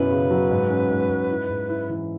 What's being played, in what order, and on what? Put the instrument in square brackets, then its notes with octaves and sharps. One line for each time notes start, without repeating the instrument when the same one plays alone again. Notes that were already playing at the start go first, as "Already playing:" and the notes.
Already playing: [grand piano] F#2 B2 E4 [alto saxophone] B4
[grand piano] C#3
F#3
G#2
C#4
G#2
G#2
E4
G#2
E4
E3